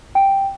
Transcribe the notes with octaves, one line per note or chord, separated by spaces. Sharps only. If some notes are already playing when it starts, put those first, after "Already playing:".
G5